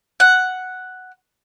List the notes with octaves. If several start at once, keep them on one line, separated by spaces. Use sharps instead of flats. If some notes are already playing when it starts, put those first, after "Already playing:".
F#5